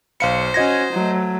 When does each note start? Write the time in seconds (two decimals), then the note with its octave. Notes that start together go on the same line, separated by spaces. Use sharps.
0.20 B1 C5 F5 C#7
0.54 C#4 F#4 D#5 G#6 A#6
0.92 F#3 A3